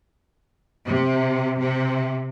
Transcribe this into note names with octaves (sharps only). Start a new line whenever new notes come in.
C3
C3